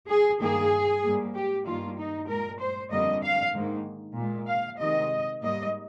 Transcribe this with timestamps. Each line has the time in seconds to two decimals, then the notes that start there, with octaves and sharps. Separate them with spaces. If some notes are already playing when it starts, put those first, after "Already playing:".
0.08 G#4
0.40 G2 D#3 A#3 G#4
1.03 G#2 G3 A#3
1.34 G4
1.65 G2 D#3 G3 A#3 F4
1.97 D#4
2.28 A#2 G#3 A#4
2.59 C5
2.91 F2 D3 G3 A#3 D#5
3.22 F5
3.53 G#2 D#3 A#3
4.16 A#2 G#3
4.47 F5
4.79 C3 D#3 G#3 D#5
5.41 G#2 G3 A#3 D#5